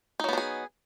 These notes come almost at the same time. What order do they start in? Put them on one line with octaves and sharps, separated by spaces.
D#4 F#3 B3 D4 G#4